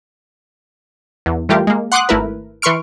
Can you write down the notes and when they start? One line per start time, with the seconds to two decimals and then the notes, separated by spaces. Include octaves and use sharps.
1.26 E2
1.49 E3 G3 A3 F4 G4 A#4
1.67 G#3 A#3
1.92 F#5 C6 D6 D#6 F#6
2.09 G#1 A3 E4 A#4 B4
2.62 E3 B4 C6 C#6 F6 D7